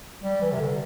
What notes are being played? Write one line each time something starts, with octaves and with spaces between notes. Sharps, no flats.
G3
E3
C3
D3